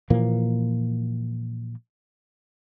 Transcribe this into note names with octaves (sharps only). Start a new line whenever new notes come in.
A#2 E3 F3 A#3